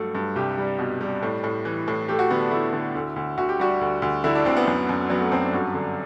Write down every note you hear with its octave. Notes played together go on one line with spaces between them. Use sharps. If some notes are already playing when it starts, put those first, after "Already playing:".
Already playing: G2 F#3 A3
G2
C2 G4
G3
B2
G3
A2
A2
E3
A2
A3 G4
F#4
D3 B3
D4
A3 E4
D3
D2
D2
D2 F#4
G4
G3 F#4
D2
D2
D3 E4
D4
D2 C4
B3
F#2
F#2
F#3 B3
A3
F#2 C4
D4
G2 F#4
D3